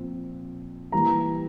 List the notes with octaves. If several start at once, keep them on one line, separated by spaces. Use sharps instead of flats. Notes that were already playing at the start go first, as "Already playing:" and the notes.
Already playing: A#2 F3 C4
E3 G3 A#3 A#5